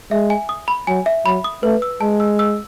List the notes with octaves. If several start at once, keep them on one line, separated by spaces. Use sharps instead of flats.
G#3 E5
G#5
D#6
B5
F#3 G#5
E5
F#3 B5
D#6
A3 B4
E6
G#3 A5
E6
E6